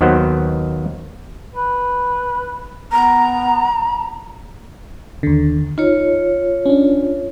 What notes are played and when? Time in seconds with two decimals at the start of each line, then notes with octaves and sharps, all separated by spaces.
0.01 D#2 D#3 F#3 B3 F#4 C5
1.54 B4
2.92 B3 A#5
5.23 D#2 D3
5.78 D#4 F4 C#5
6.66 C#4 D4